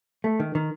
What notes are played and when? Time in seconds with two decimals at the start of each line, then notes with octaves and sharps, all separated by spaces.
0.24 A3
0.40 D#3
0.55 D#3